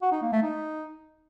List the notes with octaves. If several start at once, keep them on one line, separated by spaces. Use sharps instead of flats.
F#4
D#4
A#3
A3
D#4